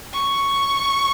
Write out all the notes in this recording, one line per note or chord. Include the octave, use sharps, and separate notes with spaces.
C#6